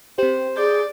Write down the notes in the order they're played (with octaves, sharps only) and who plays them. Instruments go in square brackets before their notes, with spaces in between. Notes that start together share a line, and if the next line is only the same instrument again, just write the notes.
[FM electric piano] C4 G4 [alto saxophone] C5
[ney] G#4 [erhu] D5 [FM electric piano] G6